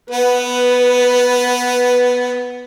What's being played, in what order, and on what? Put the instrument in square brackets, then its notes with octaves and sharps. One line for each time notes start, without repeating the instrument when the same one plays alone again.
[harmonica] B3 [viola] B4